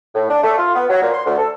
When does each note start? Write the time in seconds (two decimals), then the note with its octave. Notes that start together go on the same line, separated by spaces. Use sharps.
0.15 A2
0.30 D4
0.44 A3
0.58 F4
0.75 B3
0.90 F#3
1.01 A#2
1.13 C6
1.26 D2
1.38 A4